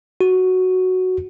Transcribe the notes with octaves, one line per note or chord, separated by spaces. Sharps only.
F#4